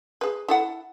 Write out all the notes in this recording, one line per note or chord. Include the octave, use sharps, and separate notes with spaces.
G#4 B4
E4 A4 F#5